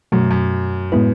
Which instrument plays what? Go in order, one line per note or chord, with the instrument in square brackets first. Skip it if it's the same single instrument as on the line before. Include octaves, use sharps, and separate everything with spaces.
[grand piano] F#2 [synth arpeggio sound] B2 F#3 A3
[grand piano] F#2
[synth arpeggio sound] A2 G#3 B3 E4 B4